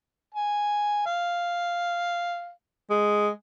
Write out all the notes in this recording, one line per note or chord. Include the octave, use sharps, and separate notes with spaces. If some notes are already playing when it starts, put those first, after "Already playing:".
G#5
F5
G#3